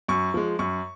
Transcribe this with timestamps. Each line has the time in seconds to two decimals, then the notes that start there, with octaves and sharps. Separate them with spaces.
0.08 F#2 C#6
0.34 F3 G#3
0.59 F#2 C#6